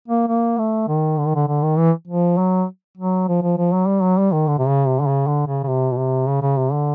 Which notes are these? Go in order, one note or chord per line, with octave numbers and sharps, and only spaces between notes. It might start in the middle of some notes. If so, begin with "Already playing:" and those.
A#3
A#3
A3
D#3
D3
D#3
D3
D3
D#3
E3
F3
F#3
F#3
F3
F3
F3
F#3
G3
F#3
G3
D#3
D3
C3
C#3
C3
D3
C#3
D3
C#3
C#3
C3
B2
C3
C#3
C#3
C3
D3